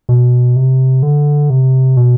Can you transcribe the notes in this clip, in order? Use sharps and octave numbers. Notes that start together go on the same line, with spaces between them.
B2
C3
D3
C3
B2